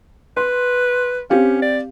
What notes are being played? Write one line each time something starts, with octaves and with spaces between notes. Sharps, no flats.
B4 C6
C4 C#4 G4 F5
D5